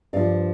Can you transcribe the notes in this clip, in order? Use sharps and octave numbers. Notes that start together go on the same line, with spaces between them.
G2 F3 D5 F5